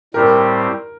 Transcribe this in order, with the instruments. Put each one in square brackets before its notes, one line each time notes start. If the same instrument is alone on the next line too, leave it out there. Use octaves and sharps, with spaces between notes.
[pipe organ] A2 G3 C4 G4 C5 [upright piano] A#4